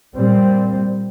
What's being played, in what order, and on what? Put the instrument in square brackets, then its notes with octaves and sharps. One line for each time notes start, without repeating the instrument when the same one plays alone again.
[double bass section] A#2 G3 C4